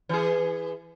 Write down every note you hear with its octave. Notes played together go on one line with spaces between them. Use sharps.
E3 G#4